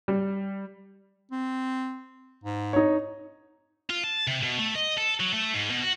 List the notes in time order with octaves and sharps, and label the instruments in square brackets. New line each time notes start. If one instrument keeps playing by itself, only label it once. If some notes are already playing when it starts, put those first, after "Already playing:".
[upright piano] G3
[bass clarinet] C4
G#2
[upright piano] D#4 C#5
[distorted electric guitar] F4
A5
C3
B2
A3
D#5
A4
F#3
A3
G#2
B2
F#4